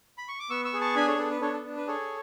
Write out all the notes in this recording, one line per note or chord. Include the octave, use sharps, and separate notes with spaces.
B5
C#6
D6
B3 C#6 E6
C#6 E6
G#4
A5 C#6
D4 G#5 B5
A4 C#5
B3 A4
B4
D4 A4 C#5
A4
D4
B4
G#4 A4 C#5